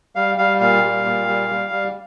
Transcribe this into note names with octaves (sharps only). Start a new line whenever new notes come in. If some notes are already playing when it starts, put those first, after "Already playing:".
G3 F5
G3 F5
A#2 F5
G3
A#2
G3
G3
G3